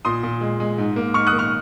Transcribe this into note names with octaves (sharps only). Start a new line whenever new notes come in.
A#2 C6 D#6
A#2
G#3
G#3
G#2
A#3
G#2 C#6 F6
D#6 F#6
A#3
C#6 F6